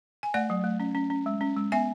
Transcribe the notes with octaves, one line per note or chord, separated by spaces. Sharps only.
G#5
A3 D5 F#5
F#3
A3
C#4
C#4
C#4
G#3
C#4
G#3
B3 E5 G#5